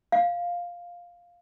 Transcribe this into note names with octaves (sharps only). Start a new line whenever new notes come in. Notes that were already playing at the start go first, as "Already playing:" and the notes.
F5